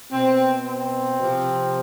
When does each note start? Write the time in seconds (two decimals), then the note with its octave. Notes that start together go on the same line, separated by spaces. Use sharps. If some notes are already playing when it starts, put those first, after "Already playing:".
0.12 B2 C4
0.66 C4
1.20 C3 F3